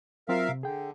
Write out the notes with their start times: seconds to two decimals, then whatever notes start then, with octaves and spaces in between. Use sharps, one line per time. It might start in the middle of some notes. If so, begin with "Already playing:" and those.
0.29 F#3 C4 F4 A#4 E5 F5
0.49 C3
0.63 D3 G#4 G5